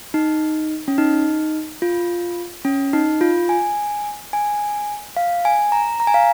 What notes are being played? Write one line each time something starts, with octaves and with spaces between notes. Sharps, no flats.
D#4
C#4
D#4
F4
C#4
D#4
F4
G#5
G#5
F5
G#5
A#5
A#5
G#5
F5